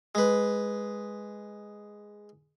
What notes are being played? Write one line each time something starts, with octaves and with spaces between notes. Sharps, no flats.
G#3 B4